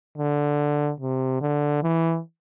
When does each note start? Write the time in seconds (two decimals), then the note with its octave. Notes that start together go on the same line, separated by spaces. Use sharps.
0.17 D3
1.00 C3
1.41 D3
1.83 E3